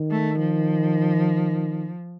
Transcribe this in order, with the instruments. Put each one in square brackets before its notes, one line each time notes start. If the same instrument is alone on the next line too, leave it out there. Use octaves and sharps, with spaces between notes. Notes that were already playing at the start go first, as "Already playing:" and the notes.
Already playing: [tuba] D#3
[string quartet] A3
F3